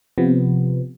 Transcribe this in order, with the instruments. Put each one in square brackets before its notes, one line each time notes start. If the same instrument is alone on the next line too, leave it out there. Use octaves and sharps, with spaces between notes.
[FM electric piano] C3 F3 B3